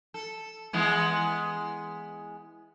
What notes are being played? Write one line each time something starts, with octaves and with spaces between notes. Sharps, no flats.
A4
E3 G#3 B3